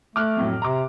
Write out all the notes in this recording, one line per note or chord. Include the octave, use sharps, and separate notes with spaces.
A3 D6 F6 F#6
F2 A2 F#3
C3 A#5 C6 D6